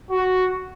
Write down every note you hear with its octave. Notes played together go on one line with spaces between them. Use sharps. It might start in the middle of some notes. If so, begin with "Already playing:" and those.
F#4